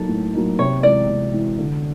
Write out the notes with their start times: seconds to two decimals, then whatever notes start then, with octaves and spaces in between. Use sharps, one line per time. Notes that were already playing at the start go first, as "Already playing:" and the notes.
Already playing: F#3 A#3 D#4 A4
0.08 A2
0.33 F#3 A#3 D#4
0.59 C3 C#5
0.83 E3 G#3 D5
1.09 C3
1.33 E3 G#3
1.59 D3